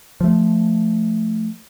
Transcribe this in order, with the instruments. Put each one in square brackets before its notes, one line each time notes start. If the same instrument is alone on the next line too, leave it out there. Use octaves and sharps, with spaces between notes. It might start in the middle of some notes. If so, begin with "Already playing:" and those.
[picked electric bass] F3 A3